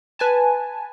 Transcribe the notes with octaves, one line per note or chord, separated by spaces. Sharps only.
B4 G#5 A5